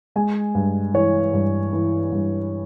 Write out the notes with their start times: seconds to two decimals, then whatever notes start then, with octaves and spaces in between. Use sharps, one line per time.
0.16 G#3 G#5
0.55 G2
0.94 E3 C#5
1.33 G2
1.73 E3
2.12 G2